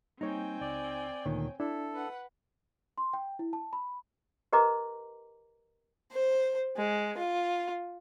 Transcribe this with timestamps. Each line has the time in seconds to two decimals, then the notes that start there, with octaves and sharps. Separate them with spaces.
0.21 G3 A#3 C4 D#4 C#5 G5 G#5
0.61 C#2 D5
1.26 D2 A#2 D#3 C#5
1.60 D4 E4 A4
1.94 B4 F#5
2.98 C6
3.13 G5
3.39 E4
3.53 A5
3.73 B5
4.53 G4 A#4 B4 D#5 A#5 D6
6.11 C5
6.77 G#3
7.17 F4